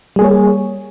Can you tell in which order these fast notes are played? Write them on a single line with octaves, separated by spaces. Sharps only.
G3 G#4 A#3 C#5